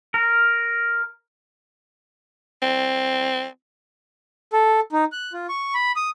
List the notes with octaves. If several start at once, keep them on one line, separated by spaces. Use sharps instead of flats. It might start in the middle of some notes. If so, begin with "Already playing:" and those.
A#4
C4
A4
D#4
F#6
F4
C#6
B5
D#6